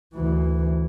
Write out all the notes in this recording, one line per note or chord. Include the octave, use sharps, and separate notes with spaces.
D2 E3